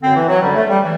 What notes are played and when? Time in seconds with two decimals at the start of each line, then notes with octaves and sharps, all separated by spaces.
0.01 F#2 D3 C4
0.15 E3
0.28 F#3
0.41 F#2 D3 G3
0.55 A3
0.69 G3
0.82 E3